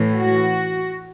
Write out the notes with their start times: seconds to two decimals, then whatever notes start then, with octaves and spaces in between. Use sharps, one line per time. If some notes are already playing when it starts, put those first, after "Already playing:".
Already playing: A2 E3
0.17 F#4